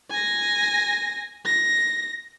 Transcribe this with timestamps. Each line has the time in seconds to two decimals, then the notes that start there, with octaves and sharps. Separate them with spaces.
0.10 G#5 A#6
1.45 A#6